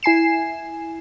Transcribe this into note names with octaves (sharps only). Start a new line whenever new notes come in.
E4 G#5 C7 E7